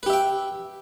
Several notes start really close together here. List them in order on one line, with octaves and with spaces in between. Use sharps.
B4 G4 E5 G5